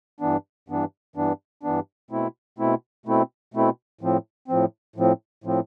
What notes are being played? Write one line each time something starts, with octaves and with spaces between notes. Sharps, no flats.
G2 E3 B3 D4
G2 E3 B3 D4
G2 E3 B3 D4
G2 E3 B3 D4
B2 A3 C4 E4
B2 A3 C4 E4
B2 A3 C4 E4
B2 A3 C4 E4
A2 F3 C4
A2 F3 C4
A2 F3 C4
A2 F3 C4